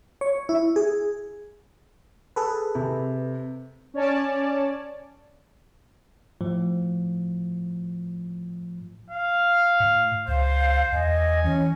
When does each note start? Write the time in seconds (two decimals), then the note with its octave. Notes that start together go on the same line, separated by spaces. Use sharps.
0.21 C#5
0.49 E4
0.76 G#4
2.36 G#4 A4 B4
2.75 C3
3.94 C#4 C#5 D5 A5
6.41 A2 F3
9.11 F5
9.80 A2
10.28 C#2 C5 F5
10.92 E2 D#5 G#5
11.44 E3 C#4